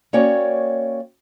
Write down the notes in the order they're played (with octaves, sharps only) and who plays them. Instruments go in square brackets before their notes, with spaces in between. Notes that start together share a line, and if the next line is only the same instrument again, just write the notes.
[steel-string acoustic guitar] A#3 C#4 F#4 C#5 D5 G5